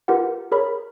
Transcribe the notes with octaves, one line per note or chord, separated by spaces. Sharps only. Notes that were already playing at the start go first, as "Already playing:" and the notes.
F4 G4 A#4 B4 F#5
G#4 A#4 C#5 B5